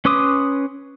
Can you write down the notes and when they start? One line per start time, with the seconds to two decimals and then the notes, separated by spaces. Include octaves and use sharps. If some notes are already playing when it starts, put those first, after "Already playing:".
0.05 C#4 B4 C6 D6 D#6